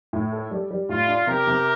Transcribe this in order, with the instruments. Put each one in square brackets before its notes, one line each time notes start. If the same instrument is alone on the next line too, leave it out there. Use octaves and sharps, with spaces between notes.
[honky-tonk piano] A2
A4
G3
G3
[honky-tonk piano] A2 [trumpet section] F4
[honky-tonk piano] D4
[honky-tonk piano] C3 [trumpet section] G4 A#4
[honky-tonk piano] C3